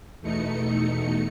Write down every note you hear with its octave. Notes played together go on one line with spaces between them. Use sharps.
E2 B2 A3 D#4 C#7